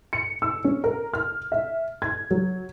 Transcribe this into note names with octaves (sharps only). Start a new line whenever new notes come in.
C#7
E6
C#4
A#4
F6
E5
G#6
F#3